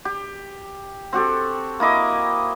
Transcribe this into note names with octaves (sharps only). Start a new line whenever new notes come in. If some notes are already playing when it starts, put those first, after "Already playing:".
G4
C4 F#4 G4 A4
A#3 E4 D#5 D6